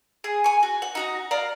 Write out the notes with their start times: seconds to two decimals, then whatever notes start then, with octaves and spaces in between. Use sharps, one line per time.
0.24 G#4
0.44 G#5 C#6
0.63 F#4
0.82 F#5
0.95 D#4 F#4 A#5
1.31 D5 F5 A#5